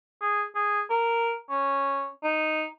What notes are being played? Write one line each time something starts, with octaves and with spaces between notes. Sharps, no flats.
G#4
G#4
A#4
C#4
D#4